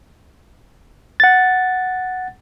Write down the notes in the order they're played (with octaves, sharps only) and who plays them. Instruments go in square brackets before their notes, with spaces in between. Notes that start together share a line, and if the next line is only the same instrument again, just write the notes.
[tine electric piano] F#5 A6